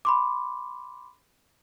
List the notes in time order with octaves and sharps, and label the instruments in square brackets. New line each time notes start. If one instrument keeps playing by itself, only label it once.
[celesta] B5 C6 D6